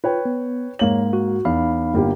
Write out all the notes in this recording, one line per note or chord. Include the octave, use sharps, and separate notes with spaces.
F4 B4 C#5 G5
B3
G#2 A#3 C#5 F#7
F#4
E2 D#4 F5 B5
G1 A#3 G4